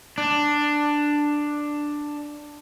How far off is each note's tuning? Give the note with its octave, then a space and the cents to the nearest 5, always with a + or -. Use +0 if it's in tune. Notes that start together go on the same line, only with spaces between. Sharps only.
D4 +5